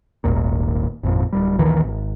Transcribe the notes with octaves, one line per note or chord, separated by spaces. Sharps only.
D#1 G#1 D#2 A#2
G#1 F2 A#2
D1 G3
A#1 D#2 D#3 E3
G#1